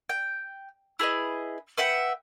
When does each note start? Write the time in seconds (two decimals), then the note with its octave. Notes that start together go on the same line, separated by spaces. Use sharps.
0.09 G5
0.99 E4 G#4 B4 D#5
1.78 B4 E5 F#5 G5